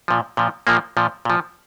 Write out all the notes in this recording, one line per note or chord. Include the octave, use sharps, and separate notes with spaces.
A#2 F3
A#2 F3
A#2 F3 A#3
A#2 F3
A#2 F3